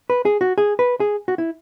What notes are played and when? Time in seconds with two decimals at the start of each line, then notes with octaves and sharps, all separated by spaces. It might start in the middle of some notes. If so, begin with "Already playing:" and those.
0.10 B4
0.25 G#4
0.41 F#4
0.58 G#4
0.79 B4
1.00 G#4
1.28 F#4
1.38 E4